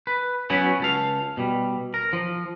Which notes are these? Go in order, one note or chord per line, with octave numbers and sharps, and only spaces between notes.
B4
F#3 B3 C#4 E4 F#4 B4
C#2 A4 F5
B2 G3
A#4
F3